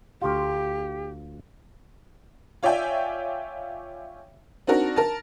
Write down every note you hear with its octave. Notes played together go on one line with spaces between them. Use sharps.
D2 F4 G4
F4 C#5 D5 E5 G5 G#5
C4 D4 D#4 F#4 A#4
A#4 A5